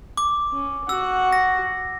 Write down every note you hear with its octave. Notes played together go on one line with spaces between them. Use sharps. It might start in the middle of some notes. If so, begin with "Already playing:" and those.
D6
C#4
F#4 F#5 E6
A#6